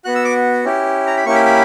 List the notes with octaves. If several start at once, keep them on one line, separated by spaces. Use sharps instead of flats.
B3 F#4 F#6
E6
D6
C#4 E4 G4
A#5
B5
A#3 C#4 E4 G4 C#6
B5
B5